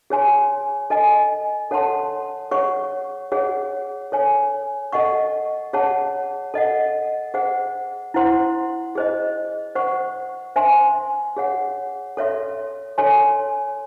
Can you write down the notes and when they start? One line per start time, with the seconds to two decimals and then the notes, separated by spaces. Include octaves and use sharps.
0.10 G#4 C#5 G#5 C6
0.90 A4 D#5 G#5
1.71 A4 C#5 F#5 A5 C6
2.51 G#4 C#5 F#5 C#6
3.32 G#4 C#5 F#5
4.12 A4 C#5 G#5
4.92 A4 D#5 F#5 C#6
5.73 G#4 C#5 F#5 A5
6.54 A4 D#5 F#5
7.34 G#4 C5 F#5
8.14 E4 C5 F#5 C6
8.95 G#4 C5 D#5
9.75 C5 F#5 C#6
10.56 C5 E5 G#5 C6
11.37 G#4 C#5 F#5
12.17 A4 C#5 E5 C6
12.98 A4 C#5 G#5 C6